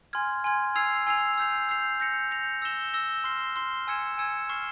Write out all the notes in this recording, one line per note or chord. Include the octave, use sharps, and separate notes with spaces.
G#5 C6 F6 G#6
G#5 C6 F6 G#6
G#5 E6 G#6 C7 F7
G#5 E6 G#6 C7 F7
E6 G6 C7 F7
E6 G6 C7 F7
G6 A#6 C#7 F7
G6 A#6 C#7 F7
E6 A#6 E7 G7
E6 A#6 E7 G7
C6 F6 C7 G7
C6 F6 C7 G7
G#5 E6 G#6 C#7 E7
G#5 E6 G#6 C#7 E7
C#6 F6 C7 E7 G7